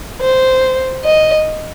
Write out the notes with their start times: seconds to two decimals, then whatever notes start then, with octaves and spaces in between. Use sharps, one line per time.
0.21 C5
1.04 D#5